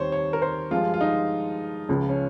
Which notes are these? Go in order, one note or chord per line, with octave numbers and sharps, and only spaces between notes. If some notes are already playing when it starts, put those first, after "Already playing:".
Already playing: D#2 D#3 G3 C4 C5 C#5
C#5
A#4
C5
G2 F3 G#3 F4
F4
D#4
C#2 C#3 F3
C#4